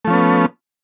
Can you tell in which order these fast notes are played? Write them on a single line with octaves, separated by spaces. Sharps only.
A3 F3 C#4 B3